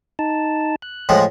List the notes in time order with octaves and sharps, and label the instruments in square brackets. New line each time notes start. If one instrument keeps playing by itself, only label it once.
[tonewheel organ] D#4 A5
F#6
[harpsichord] A2 F3 G#3